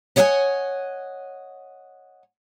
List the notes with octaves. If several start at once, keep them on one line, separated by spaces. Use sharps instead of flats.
B4 C#5 D#5 E5 F#5 G#5